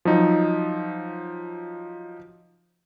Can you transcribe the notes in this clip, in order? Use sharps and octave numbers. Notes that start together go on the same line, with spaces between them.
F3 F#3 D#4